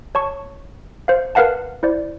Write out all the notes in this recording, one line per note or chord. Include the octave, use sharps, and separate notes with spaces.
C#5 A5 C#6
C5 F5
A#4 B4 F5 F#5 A5
E4 C5 D5